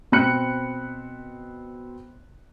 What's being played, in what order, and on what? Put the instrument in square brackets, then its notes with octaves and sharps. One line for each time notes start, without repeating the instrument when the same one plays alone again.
[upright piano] B2 C4 C5 B5 F#6 C#7